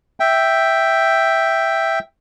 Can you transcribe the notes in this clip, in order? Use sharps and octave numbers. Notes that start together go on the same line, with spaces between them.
E5 G5